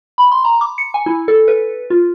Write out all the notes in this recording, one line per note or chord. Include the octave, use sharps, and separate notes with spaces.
B5
C6
A#5
D6
C#7
G#5
E4
A4
B4
F4